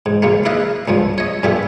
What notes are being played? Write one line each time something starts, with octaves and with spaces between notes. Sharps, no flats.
G#2
C#3 F#3 G#3 A#3
E4 B4 D5 D#5 F5
C#2 G2 F3
C#5 D#5
G2 E3 G3 A3 B3 E4